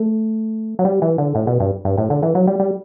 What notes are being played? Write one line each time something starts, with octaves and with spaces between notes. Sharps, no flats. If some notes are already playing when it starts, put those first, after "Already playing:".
Already playing: A3
F#3
G3
E3
D3
A2
B2
G2
G2
A2
D3
E3
F#3
G3
G3